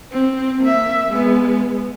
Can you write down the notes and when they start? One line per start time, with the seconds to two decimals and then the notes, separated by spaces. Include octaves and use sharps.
0.12 C4
0.61 A#3 E5
1.08 G#3 B3